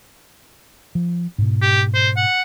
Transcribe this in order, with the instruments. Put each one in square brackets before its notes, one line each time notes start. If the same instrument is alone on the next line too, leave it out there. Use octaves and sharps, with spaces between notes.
[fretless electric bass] F3
G#2 B2
[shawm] G4
C5
F#5